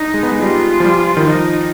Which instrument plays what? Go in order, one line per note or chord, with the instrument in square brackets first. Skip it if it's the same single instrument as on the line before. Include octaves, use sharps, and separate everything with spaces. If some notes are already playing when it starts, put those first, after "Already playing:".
Already playing: [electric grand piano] D4 [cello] D#4
[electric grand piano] G#3
B3
G#3
[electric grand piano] G3 [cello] F4
[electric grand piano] F3
G3
D#3
[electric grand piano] F3 [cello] D#4